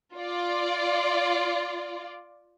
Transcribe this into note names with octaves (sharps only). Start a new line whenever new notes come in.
F4 D5